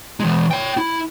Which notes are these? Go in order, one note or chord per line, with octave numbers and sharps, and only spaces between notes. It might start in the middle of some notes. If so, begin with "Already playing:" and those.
E3 G#3
C#5 G5
E4